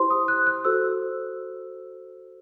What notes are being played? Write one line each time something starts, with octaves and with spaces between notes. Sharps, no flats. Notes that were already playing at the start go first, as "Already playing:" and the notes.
Already playing: E4 G4 C5 C6
D#6
F#6
F#6
F#4 A4 C5 E6